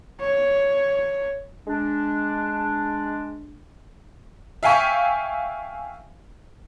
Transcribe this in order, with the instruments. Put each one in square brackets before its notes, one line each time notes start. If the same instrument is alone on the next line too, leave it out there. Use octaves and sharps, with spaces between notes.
[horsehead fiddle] C#5
[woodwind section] G#3 D4
[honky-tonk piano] E5 F5 G5 G#5 C#6 B6